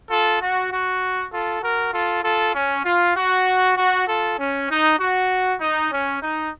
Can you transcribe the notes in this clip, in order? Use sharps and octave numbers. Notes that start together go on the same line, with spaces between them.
F4 A4
F#4
F#4
F4 A4
F#4 A#4
F4 A4
F4 A4
C#4
F4
F#4
F#4
F4 A4
C#4
D#4
F#4
D#4
C#4
D#4